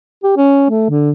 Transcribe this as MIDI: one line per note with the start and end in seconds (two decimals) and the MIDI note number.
0.23 0.32 67
0.37 0.67 61
0.70 0.88 57
0.89 1.11 50